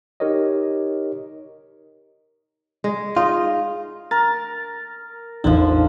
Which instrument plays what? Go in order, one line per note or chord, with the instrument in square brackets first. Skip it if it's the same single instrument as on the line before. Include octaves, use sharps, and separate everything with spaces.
[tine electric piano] D#4 G4 A#4 C#5 D#5
[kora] G#3
[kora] D#4 D#5 [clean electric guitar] F4
[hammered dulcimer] A#4 [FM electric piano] A6
[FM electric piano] A1 E2 D#4 [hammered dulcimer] D3 F3